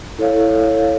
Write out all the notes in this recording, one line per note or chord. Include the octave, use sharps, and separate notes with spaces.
E4 A4 C#5 F5
E4 A4 C#5 F5